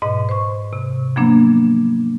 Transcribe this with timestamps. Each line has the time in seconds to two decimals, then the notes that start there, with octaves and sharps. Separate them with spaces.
0.02 G#2 B2 D#5
0.29 C5 C#6
0.73 C3
1.16 F3 F#3 A#3 B3 D4